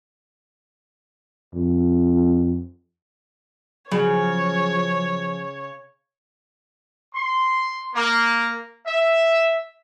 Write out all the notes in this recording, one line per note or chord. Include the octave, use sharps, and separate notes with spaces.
F2
C#3 F3 F#3 C#5
C6
A#3
E5